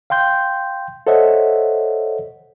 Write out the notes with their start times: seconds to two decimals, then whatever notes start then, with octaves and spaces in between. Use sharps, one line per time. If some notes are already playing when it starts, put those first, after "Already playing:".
0.10 F5 G5 C6 G6
1.07 A4 C5 C#5 D#5 E5 F#5